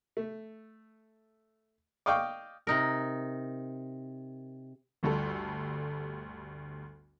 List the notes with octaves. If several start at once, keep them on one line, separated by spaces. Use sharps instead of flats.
A3
D5 D#5 F5 G5 C#6 D6
C3 D#4 A#4
G1 D2 G3 A4